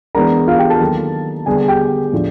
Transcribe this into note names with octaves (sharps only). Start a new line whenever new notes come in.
E3 G#3 B3 D4 A#4 A#5
F4 F5
G4 G5
A4 A5
D#3 F#3 A#3
D3 G3 B3 D4 G#4 G#5
G#4 G#5
G4 G5
A2 F3 A3 D4